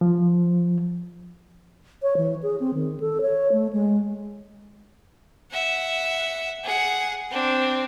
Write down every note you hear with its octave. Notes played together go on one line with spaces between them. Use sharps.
F3
C#5
E3
G#4
C4
D#3
A4
C#5
A3
G#3
E5 F#5
G#4 F#5
C4 D4